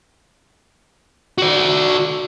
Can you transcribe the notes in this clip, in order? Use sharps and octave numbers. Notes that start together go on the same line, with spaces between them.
F#4 D5